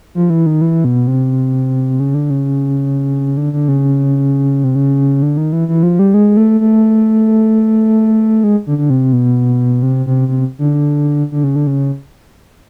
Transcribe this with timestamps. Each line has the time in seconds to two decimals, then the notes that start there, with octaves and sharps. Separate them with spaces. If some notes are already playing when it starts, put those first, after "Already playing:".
0.15 F3
0.30 E3
0.46 D#3
0.61 E3
0.85 B2
1.07 C3
2.00 C#3
2.14 D3
2.30 C#3
3.37 D3
3.53 D3
3.68 C#3
4.64 C3
4.75 C#3
5.22 D3
5.37 D#3
5.53 E3
5.68 E3
5.83 F3
5.99 G3
6.14 G#3
6.37 A3
6.60 A3
8.44 G#3
8.67 D3
8.78 D3
8.90 C3
9.13 B2
9.82 C3
10.06 C3
10.28 C3
10.59 D3
11.32 D3
11.44 C#3
11.56 D3
11.67 C#3